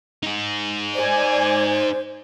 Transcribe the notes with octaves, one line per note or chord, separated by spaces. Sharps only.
D#4 G#4
C5 D5 G#5